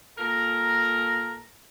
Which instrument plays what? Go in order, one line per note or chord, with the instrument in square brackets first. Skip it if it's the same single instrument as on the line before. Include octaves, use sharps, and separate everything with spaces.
[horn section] A#2 A4 A#4 A#5